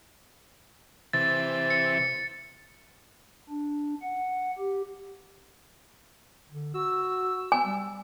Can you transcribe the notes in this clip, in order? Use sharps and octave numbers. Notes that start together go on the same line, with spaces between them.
C3 E3 A6
C#7
D4
F#5
G4
D3
F#4 E6
G#5
G3